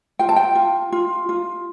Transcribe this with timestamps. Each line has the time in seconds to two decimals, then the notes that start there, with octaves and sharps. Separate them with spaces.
0.19 F4 G5
0.29 A5
0.36 G5
0.55 F4
0.92 F4
1.29 F4